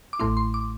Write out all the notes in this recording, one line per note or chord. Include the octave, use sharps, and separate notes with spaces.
D6
A1 A2 A3 E4 C6
C6
D6